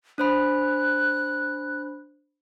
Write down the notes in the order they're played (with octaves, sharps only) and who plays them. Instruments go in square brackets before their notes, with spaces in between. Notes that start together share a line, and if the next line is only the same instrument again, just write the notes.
[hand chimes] D4 C5 B5 [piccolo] F#6